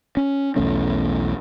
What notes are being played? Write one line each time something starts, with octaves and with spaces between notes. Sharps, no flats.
C#4
B1 E2 A3 C#4